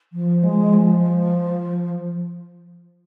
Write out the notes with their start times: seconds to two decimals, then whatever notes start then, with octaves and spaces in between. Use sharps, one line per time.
0.13 F3
0.43 G#3
0.73 F3